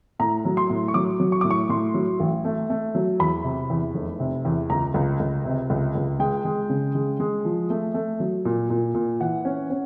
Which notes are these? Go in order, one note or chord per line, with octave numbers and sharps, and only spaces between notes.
A2 A#5
F#3
C6
A2
C#6
F#3 D6
F#3
C#6
A2 D6
C#6
A2 C6
F#3
A1
A3
A3
F#3
E2 B5
C3
E2
F1
C3
E2
C#2 A#5
C#2
C#2
C3
C#2
C#2
G#3 G5
G#3
C#3
G#3
G#3
F3
A3
A3
F#3
A#2
A#2
A#2
E3 F#5
C#4
C#4